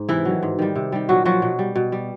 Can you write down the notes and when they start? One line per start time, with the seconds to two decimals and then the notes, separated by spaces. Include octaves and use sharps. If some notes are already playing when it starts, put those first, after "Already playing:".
Already playing: G#2
0.09 C3 E3 E4
0.25 D#3 F#3
0.43 G#2
0.59 D#3 G3
0.76 C3
0.92 D#3 G3
1.09 A#2 F#3 F#4
1.25 F3 F#3 F#4
1.42 B2
1.59 G3
1.76 B2
1.92 G3